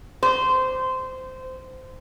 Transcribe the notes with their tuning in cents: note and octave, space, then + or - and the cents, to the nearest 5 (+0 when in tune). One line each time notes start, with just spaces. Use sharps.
C5 -15